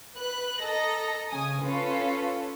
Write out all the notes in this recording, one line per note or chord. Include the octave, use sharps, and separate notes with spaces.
B4 F#6
A4 D#5 A#5 A#6
C#3 G#5 D#6
C#4 F4 A4 B4